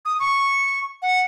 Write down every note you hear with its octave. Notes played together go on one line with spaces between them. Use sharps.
D#6
C#6
F#5